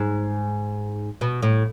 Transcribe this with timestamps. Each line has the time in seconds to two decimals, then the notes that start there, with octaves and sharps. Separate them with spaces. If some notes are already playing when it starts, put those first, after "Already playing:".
Already playing: G#2
1.21 B2
1.42 A2